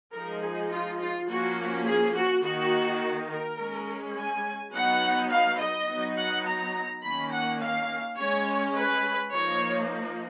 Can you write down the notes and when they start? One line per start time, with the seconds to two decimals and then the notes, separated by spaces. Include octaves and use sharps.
0.13 F3 G#3 D#4 A#4
0.42 G#4
0.71 F4
0.99 F4
1.28 F3 A#3 C#4 F#4
1.86 G#4
2.15 F#4
2.43 D#3 A#3 D#4 F#4
3.29 A#4
3.58 G#3 C#4
4.16 G#5
4.73 F#3 B3 D#4 F#5
5.30 F5
5.59 D#5
5.88 F#3 B3 D#4
6.17 F#5
6.46 A#5
7.03 D#3 A#3 C#4 B5
7.32 F#5
7.60 F5
8.18 G#3 C#4 C#5
8.76 B4
9.33 F3 A#3 D#4 C#5